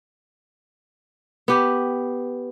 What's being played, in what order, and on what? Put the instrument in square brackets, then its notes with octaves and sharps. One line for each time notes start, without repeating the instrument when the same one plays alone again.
[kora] B3 G4